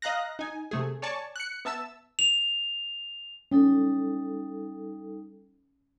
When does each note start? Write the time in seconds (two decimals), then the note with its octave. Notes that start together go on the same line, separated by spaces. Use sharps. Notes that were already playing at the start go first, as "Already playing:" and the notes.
0.02 D#5 F5 A#5 F#6 A#6
0.39 D#4 G#5
0.71 C3 A3 G#4
1.02 C#5 D5 G#5 A5 C#6
1.36 F#6 C#7
1.65 B3 E5 A5 E6
2.19 F7
3.52 G3 C#4 D#4 A4